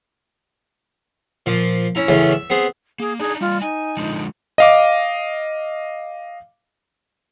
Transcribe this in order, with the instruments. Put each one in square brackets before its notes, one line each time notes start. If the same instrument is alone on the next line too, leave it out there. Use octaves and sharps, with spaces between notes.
[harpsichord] A#2 F3
C#4 E4 A#5
E2 A2 C#3 E3 C#4
E5
B3 C4 G#4
[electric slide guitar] A#3 [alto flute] G#4
[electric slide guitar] D4 D#4 [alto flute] G#4
[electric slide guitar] G3 D#5 [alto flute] F4
[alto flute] D#4 [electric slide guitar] G#5
[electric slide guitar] D3 F3 G#3
[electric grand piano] D#5 F5 D6